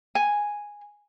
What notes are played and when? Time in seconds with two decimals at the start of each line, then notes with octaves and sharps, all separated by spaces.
0.15 G#5